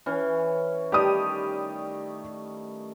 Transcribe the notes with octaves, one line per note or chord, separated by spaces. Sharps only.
E3 C#4
D#3 G3 A3 G4 D5 D#6